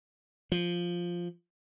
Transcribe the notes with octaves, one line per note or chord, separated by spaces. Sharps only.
F3